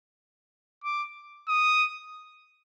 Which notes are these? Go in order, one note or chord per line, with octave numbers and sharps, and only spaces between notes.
D6
D#6